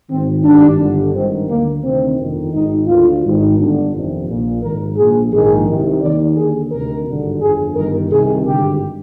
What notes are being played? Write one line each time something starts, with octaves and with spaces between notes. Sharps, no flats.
G#1 G#2 D#3 C4
G#1 G2 D#3 D4
G1 G2 D3
G#1 G2 D#3 C4
D2 D3 A#3
D2 C3 D#3 C4
G1 F2 D#3
G#1 G#2 D#3 D#4
D2 D3 F4
G#1 G#2 D#3
G1 G2 D3
G1 F2 C3 D#3
A#1 A#2
G#1 G#2 D#3 A#4
A#1 A#2 G#4
A#1 G#2 D#3 G#4
C2 C3 D#3
D#2 D#3 D5
D#2 D3 G#4
D2 C3 D#3 A#4
G#1 G2 D3
G1 F2 D3 G#4
G1 G2 D#3 A#4
C2 C3 D#3 G#4
G#1 G2 D3 G4